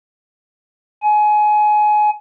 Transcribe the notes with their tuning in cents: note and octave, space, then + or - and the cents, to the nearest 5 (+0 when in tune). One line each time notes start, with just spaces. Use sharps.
G#5 +25